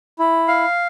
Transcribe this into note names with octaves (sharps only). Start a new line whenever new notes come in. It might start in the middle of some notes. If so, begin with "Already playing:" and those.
E4
F5